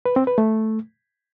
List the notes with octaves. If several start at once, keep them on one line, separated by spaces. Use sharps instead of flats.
B4
C4
B4
A3